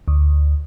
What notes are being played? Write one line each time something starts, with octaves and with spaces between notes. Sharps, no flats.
D2